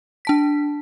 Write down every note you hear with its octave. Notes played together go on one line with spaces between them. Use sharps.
D4 A5 B6